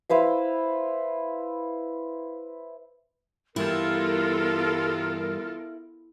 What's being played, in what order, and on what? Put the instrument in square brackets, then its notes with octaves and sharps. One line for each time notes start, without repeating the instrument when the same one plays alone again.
[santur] E4 B4 C5 F5
[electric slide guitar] G2 E3 G3 [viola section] B3 F4 A4 [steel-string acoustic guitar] E4 [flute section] A#4